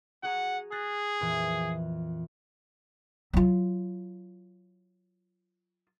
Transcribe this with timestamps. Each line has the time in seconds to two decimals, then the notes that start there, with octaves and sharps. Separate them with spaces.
0.23 F#4 G#4 F#5 A#5
0.72 G#4 F#6 A6 A#6
1.21 F2 A#2 E3
3.33 F#3 F4